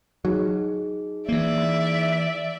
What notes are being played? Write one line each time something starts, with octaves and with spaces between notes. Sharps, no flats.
F#3 D#4 G#4
E3 A#3 D5 E5